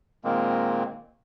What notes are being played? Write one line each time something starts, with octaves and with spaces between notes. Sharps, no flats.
A#2 D#3 G#3 A#3 C4